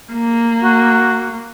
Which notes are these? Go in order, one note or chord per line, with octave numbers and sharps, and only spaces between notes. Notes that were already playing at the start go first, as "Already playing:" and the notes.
A#3
F#4